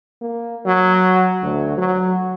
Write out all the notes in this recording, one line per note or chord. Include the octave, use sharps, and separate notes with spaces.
A#3
F#3
D2
F#3